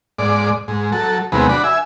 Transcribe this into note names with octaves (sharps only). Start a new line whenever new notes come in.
G#2 D5
G#2
F#3 A4
D#2 C3 F#3 G#3 B3
D4 F#4 B5
E5 G#5